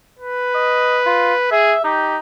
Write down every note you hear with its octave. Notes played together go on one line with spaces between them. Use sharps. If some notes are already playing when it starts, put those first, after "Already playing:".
B4
D#5
F4
G#4 E5
D#4 G4